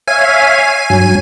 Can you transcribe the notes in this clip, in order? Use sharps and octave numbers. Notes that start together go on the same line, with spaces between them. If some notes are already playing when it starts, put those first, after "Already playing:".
C#5 E5 F5 G#5
G2 F#3